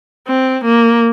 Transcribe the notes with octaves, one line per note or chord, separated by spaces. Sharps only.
C4
A#3